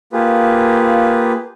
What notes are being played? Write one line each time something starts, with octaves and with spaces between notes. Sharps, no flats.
A#3 F4 G4 G#4 B4